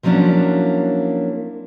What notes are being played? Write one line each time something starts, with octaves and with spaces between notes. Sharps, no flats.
F3 F#3 A#3 C#4 D4 E4